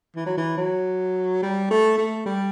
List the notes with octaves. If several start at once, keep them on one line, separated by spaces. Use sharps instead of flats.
E3
F#3
E3
F#3
G3
A3
A3
G3